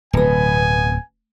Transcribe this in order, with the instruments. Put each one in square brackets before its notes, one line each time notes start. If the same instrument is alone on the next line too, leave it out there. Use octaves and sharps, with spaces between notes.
[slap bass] D1 [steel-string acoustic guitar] B2 B3 [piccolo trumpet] G#5